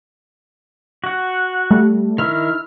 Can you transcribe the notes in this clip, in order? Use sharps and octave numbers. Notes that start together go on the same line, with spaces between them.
F#4 F#5
G3 A3
D#3 E4 E5 F6